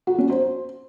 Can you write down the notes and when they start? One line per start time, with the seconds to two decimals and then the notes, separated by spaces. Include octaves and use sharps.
0.07 F#4
0.18 C#4
0.30 C5